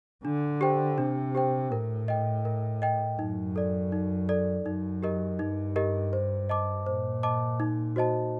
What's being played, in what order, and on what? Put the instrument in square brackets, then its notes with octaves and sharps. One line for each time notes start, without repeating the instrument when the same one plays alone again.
[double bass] D3 [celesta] D4
[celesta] G4 C5 G5
[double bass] C3 [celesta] D4
[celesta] G4 C5 G5
[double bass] A2 [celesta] A#4
[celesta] D#5 G5
A#4
D#5 G5
[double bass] F#2 [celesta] D#4
[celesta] A4 D5
D#4
A4 D5
[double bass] F#2 [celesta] D#4
[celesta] G4 A#4 D#5
[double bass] G2 [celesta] D#4
[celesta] G4 A#4 D#5
C5
D#5 A5 D6
[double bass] A#2 [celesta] C5
[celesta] D#5 A5 D6
D#4
F#4 C5 D#5 A5